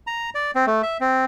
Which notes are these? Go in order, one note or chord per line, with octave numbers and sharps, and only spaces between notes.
A#5
D5
C4
A3
E5
C4